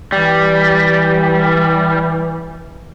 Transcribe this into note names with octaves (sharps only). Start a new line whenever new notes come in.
E3 G3